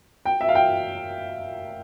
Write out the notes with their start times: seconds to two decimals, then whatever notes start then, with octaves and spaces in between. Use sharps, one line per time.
0.25 G5
0.41 E5
0.49 F5
0.55 G5